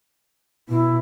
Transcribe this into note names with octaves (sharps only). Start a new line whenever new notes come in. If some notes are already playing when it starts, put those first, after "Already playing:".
B2 E4